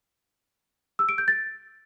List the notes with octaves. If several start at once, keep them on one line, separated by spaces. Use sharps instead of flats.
E6
D7
G6
A6